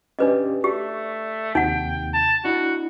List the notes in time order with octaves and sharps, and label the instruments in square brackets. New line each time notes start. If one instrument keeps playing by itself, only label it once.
[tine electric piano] C#4 G4 D5 [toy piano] D4 B4 D#5
[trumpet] A3 [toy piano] G4 [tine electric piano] D5
[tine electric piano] D#2 C3 [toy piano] D#4 F#5 [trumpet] G5
[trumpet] A5
[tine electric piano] D4 E4 [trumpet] F#4